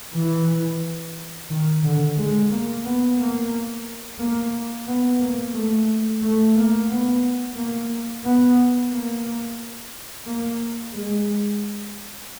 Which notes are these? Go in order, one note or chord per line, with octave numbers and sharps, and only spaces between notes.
E3
D#3
D3
G#3
A#3
B3
A#3
A#3
B3
A#3
A3
A3
A#3
B3
A#3
B3
A#3
A#3
G#3